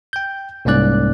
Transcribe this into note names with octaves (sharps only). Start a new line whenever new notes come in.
G5 G6
C2 G#2 A#3 C#4 D5 F#6